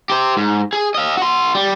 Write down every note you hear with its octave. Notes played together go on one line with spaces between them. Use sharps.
G4 C5
G#2
G#4
D#5 F5
F#4 C6
G3